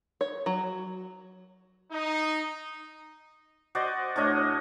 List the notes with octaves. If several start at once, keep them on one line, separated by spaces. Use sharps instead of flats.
C#5
F#3
D#4
F#4 C5 D5 D#5
A2 D4 C#5 D#5